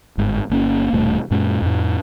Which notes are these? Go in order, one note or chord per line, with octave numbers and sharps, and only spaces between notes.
G1 G#2
G1 A#3 C#4
D#1 G2 B2 A3
F#2 A#2 G#3 C#4
F2 A2